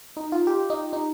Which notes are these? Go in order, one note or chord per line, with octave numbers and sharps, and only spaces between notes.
D#4
F4
G4
D#4
D#4